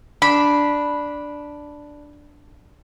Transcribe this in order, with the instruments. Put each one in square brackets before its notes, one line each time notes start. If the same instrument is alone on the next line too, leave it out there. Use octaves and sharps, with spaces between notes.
[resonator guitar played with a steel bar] D4 [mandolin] B5